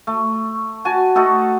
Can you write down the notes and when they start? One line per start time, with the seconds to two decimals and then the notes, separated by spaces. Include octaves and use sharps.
0.07 A3
0.85 F#4 G#5 A5
1.15 A3 D#4 F#4 A4